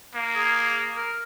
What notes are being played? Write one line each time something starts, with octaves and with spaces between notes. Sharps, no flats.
A#3
G#4
A#4